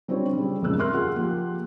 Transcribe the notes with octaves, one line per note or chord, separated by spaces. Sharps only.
G3 C4 D4 F4 C#5
C#3 G3
D#1 F2 G#2 C#3 E6 F#6
A#4 E5 C6 F6 F#6
F4 G4 G#4 F#5
F3 A#3 G4